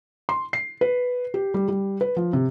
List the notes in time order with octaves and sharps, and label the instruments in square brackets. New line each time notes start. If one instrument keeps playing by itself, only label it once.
[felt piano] C6
C7
B4
G4
G3
G3
B4
F3
C3